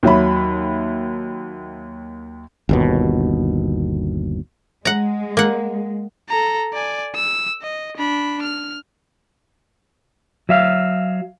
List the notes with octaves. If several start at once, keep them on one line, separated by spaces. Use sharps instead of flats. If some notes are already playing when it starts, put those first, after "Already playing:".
D#2 F#3 E5 B5
G1 D#2 B2
G#3 F#5 A#5
A#3 F#5
A4 A#5
D5 G#5
E6
D#5
D4 B5
F6
F#3 E5 F5